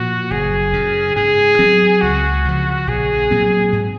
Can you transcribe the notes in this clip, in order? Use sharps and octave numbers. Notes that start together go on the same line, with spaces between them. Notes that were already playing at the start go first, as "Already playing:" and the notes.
Already playing: A#2 F3 F#4
F#1 G#4
F#2 C#3
G#2 G#4
F#3 C4
C#2 F#4
C#3 F3
A#1 G#4
A#2 F#3 C4
G#2